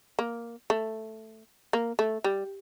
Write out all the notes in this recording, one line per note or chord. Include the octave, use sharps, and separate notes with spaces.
A#3
A3
A#3
A3
G3